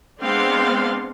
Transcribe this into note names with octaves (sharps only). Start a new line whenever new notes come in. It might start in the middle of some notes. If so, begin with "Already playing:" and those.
G#3 B3 C4 D4 F5 C6